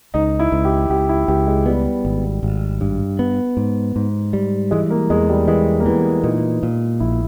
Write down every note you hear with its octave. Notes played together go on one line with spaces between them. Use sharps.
C#2 D#4
E4
C#2
G4
C#2 G4
E4
C#2 G4
G#3
G3 B3
G#1
G#1
G2
B3
G#2
G#2
G3
E3 G#3
A#3
E2 G#3
G3
E3 G#3
A#3
E3 B3
A#2 D#4
A#2
A#1 E4